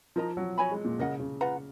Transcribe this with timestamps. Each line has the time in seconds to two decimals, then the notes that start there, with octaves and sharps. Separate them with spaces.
0.16 F3 D#4 A#4 D#5 A#5
0.37 F#3
0.58 F#4 C#5 G#5 B5
0.71 G#3
0.85 A#2
0.99 C#3 A#4 D#5 F#5
1.20 C#3
1.41 F4 B4 F#5 A#5